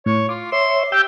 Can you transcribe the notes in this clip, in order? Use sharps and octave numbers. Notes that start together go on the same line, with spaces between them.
A2 C#5
F4 D6
C#5 E5 C6
G4 G5 E6 G6